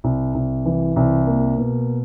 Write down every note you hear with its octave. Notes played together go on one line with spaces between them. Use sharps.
C2
C2
E3
C2
A#3
B2